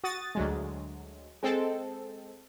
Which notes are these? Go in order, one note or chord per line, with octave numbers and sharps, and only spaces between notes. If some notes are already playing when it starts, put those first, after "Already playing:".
F#4 D#6 A6
D2 F#3 G#3
G#3 C4 A4